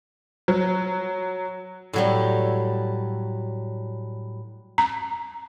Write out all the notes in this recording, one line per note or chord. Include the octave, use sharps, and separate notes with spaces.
F#3
A2 F#3 G3
A#5